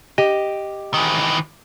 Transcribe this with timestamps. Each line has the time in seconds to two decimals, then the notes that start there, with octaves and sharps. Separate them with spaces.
0.18 G4 D#5
0.94 D#3 E3